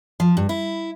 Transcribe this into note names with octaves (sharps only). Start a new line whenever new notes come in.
F3
G2
E4